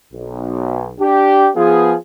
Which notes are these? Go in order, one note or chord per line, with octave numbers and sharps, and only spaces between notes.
B1
D4 G4
F3 B3 F4 G#4